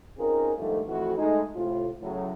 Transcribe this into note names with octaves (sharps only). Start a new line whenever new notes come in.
C4 C#4 D#4 F4 G#4 A#4
G#2 D3 D#3 F3 G3 A3
F2 E3 A3 F#4
G#3 A3 D#4
A2 C3 F4
A2 C#3 F#3